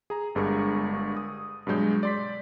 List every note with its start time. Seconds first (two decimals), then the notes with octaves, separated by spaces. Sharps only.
0.10 G#4 A#5
0.35 G1 G2 G#3 G#4 A#4 C#6
1.17 D#6
1.67 G2 B2 F#3 G#3 G6
2.03 D5 C6 B6